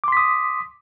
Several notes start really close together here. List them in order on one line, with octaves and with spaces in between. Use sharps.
D6 C6 B6 D#6